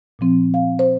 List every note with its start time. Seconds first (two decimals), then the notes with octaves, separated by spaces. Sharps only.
0.19 A#2 F3 C4
0.54 F5
0.79 C5